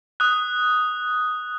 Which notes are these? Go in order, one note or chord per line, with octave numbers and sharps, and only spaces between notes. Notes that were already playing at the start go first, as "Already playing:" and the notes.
D#6 F#6